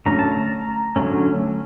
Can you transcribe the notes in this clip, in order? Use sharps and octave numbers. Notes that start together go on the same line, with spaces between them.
D3 F#3 A3 C#4 A#5
A5
A#5
D3 F#3 A3 C#4